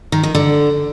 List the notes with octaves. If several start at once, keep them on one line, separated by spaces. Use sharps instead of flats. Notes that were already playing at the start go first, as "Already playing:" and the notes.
D#3
D#3
D3